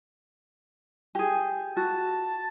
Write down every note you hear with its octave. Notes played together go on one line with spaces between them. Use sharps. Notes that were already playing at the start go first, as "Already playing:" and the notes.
G4 G#4
F#4 A5